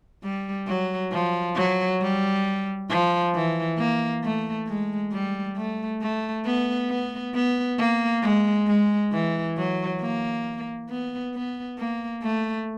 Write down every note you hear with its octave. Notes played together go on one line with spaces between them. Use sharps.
G3
F#3
F3
F#3
G3
F3
E3
A#3
A3
G#3
G3
A3
A3
B3
B3
B3
A#3
G#3
G#3
E3
F#3
A#3
B3
B3
A#3
A3